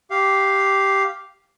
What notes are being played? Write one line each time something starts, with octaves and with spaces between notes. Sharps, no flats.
G4 F5